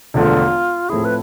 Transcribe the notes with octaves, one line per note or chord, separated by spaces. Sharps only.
E1 E2 D3 F3 A3 F4
A2 F3 A3 C4 E4 G#4
B4